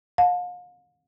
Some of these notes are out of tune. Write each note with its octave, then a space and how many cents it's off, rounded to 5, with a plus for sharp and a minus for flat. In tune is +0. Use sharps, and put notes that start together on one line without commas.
F5 +40 A5 +0